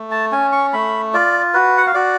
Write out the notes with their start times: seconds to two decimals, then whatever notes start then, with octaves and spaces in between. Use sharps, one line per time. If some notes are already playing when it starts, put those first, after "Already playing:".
Already playing: A3
0.11 A5
0.32 C#4 G#5
0.52 C#6
0.73 A3 B5
1.14 F4 D5
1.54 F#4 B4
1.77 F#5
1.87 F5
1.94 F#4 D5